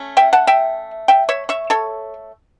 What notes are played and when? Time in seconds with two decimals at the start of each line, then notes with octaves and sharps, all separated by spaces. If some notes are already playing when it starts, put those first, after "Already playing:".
Already playing: A3 C#4
0.17 E5 G5
0.33 F#5 A5
0.47 E5 G5
1.08 E5 G5
1.29 C#5 E5
1.49 C#5 E5
1.70 A4 C#5